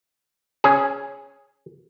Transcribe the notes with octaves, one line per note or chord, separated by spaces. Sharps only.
C#4 G#4